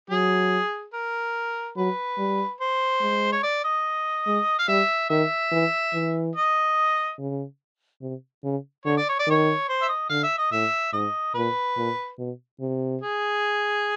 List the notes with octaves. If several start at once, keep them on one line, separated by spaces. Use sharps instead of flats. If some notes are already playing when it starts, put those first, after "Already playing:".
F#3 G#4
A#4
F#3 B4
G3
C5
G#3
C#5
D5
D#5
G#3
F5
G3 E5
D#3 E5
E3
E3
D#5
C#3
C3
C#3
D3 C#5
D5
C#5
D5
D#3 C#5
C5
E5
D#5
D3 F5
E5
D#5
A2 E5
G#2 D#5
A#2 B4
A#2
B2
C3
G#4